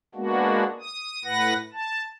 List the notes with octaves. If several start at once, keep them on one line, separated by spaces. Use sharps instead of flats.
G#3 A#3 B3 D4 F#4
D#6
A2 B4 F#5 A#6
A5